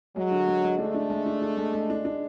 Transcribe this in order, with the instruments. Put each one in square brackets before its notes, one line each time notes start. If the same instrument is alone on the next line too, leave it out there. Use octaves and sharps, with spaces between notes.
[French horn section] F#3 [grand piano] G#3
[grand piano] D3
G#3
G#3
[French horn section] A3 [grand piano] D4
[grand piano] D4
G#3
D4
D4
G#3
G#3
D4
D4